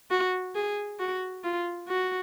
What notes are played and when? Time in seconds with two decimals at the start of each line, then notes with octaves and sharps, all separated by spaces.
0.11 F#4
0.55 G#4
0.99 F#4
1.44 F4
1.88 F#4